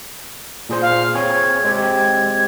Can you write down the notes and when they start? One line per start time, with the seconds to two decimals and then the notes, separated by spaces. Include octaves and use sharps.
0.69 A#2 G#4 C5
0.81 F5
1.14 C4 G#4 C#5 G#6
1.64 G#3 C4 G4
1.93 G#6